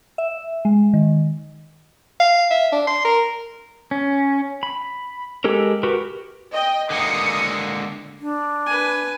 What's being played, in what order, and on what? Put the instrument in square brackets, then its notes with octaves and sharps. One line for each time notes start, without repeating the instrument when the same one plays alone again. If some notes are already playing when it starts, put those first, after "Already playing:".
[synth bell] E5
G#3
D#3
[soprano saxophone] F5
E5
D4
C6
A#4
[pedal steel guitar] C#4
B5
G#3 G4 A4 A#4
F#4 G4 A#4 B4
[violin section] D#5 G5
[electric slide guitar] D3 G#3 A#3 [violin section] D#6 C#7
[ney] D4
[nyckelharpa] B4 G#5